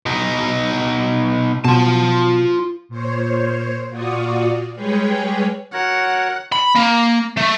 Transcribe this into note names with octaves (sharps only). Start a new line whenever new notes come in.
B2 D#4
B2 F4 A5
A#2 C5 C#5
A#2 F4 F#4 D5 C#6 D#6
G3 G#3 G#4 B4 C#5 G5
F#4 A#4 C#5 F#5
B5
A#3
A3